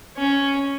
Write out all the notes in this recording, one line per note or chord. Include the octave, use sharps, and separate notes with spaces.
C#4